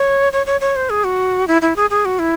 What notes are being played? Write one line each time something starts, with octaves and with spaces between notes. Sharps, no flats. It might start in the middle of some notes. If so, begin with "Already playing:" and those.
Already playing: C#5
C#5
C#5
C#5
C5
G#4
F#4
E4
E4
G#4
G#4
F#4
E4